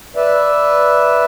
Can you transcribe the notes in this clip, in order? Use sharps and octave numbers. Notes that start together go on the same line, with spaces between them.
B4 D5 E5